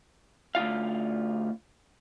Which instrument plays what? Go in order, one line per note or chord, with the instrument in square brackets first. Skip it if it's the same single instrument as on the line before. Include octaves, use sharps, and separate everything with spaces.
[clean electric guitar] D2 G#2 F4 F5